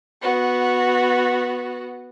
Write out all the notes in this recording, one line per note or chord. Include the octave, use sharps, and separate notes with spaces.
B3 F#4